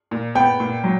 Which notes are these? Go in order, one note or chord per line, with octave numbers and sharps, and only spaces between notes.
A#2
B3 G5
A#2
F#3